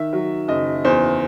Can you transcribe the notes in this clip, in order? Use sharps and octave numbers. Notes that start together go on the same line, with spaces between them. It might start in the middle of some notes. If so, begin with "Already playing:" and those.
Already playing: D#3 E5
F#3
F#1 D#5
E2 C5